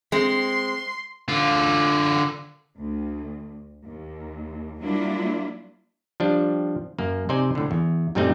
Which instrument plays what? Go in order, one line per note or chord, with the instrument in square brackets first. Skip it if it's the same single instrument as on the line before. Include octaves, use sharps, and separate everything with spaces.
[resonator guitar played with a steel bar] G#3 C4 [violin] C6
[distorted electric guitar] D3 F4
[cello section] D2
D#2
F#3 G3 A#3 D4 E4 F4
[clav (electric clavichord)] F3 G3 D4
F#2 A#3
C3 D#4 C5 D5 G#5
A2 D3
E2
F#2 A#2 G3 A3 C4 D#4